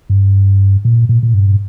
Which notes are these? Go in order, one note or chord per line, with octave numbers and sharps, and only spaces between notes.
G2
A#2
A#2
A#2
G2